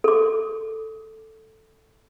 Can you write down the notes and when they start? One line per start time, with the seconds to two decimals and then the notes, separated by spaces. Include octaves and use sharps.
0.04 A4 D6